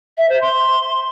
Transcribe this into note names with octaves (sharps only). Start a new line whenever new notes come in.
E5
C5
C6